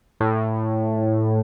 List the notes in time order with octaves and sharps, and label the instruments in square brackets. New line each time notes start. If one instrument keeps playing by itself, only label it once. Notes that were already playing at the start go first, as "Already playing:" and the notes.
[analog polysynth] A2